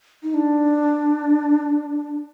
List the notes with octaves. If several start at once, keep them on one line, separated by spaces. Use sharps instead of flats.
D#4
D4